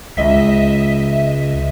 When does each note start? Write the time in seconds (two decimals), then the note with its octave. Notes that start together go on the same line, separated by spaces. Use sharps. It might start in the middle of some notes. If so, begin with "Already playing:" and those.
0.17 C#2 D#5 E5 B6